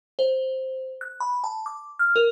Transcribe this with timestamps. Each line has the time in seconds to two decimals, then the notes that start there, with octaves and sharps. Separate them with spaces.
0.19 C5
1.01 F#6
1.20 B5
1.44 A5
1.66 D6
1.99 F6
2.16 A#4